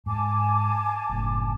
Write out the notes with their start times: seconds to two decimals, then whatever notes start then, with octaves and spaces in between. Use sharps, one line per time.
0.06 G#2 G#5 A5 D6
1.09 F#1 A2